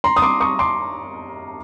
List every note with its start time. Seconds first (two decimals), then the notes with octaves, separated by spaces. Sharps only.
0.04 A#5 C6
0.17 D#6
0.22 C6 D6
0.40 C#6 D#6
0.59 C6 D6